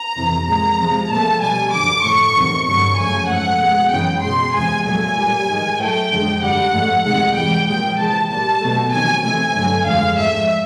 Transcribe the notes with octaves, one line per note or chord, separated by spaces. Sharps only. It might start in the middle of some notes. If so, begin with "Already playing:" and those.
Already playing: A#5
F2 C3 E3
A#2 F3 G#3 A#5
C3 F3 G#3
A#2 F3 A3 A5
B2 G3 G#5
F#2 D3 F3 D6
A2 F3 A3 C#6
E2 C3 D#3 F#3
G2 D3 F#3 C#6
F#2 C#3 F3 A3 G#5
G#2 F3 A3 F#5
B2 G#3
F#2 C#3 E3 G#3 G5
B2 G#3 C6
E2 C3 F3 G#3 G#5
A#2 F#3 A3 G#5
A#2 G3
G#2 D#3 G#3
A2 F#3 A3 G5
F2 D3 F3 G#3
F#2 D3 G3 F#5
G#2 F3 A3
F2 C3 D#3 G#3 F#5
G#2 E3 G3 G5
A#2 F3 G#3 G5
C3 E3 G#3 A5
A#2 G3 A5
B2 F#3 A3
C3 D#3 F#3 G#5
C3 E3 A3 G#5
G2 D3 F#3 A3
F2 D3 F3 G#3 F5
G#2 F3 A3 E5